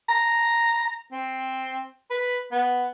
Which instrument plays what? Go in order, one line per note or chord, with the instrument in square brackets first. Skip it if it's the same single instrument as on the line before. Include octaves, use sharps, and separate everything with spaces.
[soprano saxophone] A#5
C4
B4
B3